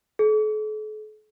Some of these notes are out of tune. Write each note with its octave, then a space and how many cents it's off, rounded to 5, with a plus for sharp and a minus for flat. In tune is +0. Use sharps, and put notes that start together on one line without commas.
A4 -45